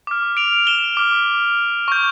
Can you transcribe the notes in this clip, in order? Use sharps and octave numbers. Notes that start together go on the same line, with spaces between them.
D6 F6
D7 F7
E7 G7
D6 F6
C#6 G6